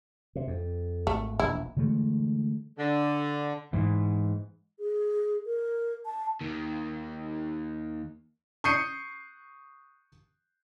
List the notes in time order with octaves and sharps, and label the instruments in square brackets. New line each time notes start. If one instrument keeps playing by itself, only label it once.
[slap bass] C3
F2
[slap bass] G#1 [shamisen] A3
[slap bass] E1 A#1 [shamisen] E4
[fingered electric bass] D3 E3 G#3 A3
[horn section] D3
[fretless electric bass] G#2 E3
[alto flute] G#4
A#4
A5
[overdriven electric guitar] D#2 D#3
[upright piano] C#6 D#6 G6 C7 C#7 D#7